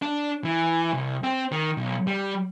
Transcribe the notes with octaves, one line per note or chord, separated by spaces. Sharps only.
D4
E3
C2
C4
D#3
B1
G3